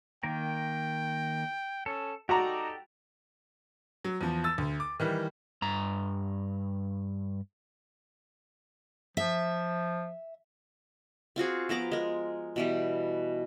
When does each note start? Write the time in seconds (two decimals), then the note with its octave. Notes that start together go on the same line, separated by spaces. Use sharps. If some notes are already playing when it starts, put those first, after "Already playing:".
0.23 D#3 A#3 A#4 G5
1.86 C#4 A4
2.29 D#4 F#4 G4 A4 D5 A#5
4.05 F#3
4.21 E2 F3
4.44 E6 A6
4.58 D2
4.80 D6
5.00 D#3 E3 G3
5.62 G2 A#5
9.17 F3 E5
11.36 C4 F4 F#4 G#4
11.69 F3 B3 A#5 D6
11.92 G#3 A#4
12.56 B2 E3 G3